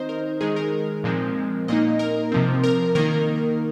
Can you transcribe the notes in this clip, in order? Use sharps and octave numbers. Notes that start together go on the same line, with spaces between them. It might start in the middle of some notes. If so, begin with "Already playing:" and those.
Already playing: D#3 C4 D#4 C5 D#5
A#4
D#3 G#3 D#4 G#4
A#4
A#2 F3 G#3 C4
A#2 A#3 D#4 D#5
A#4
C3 F3 C4
A#4
D#3 A#3 D#4 A#4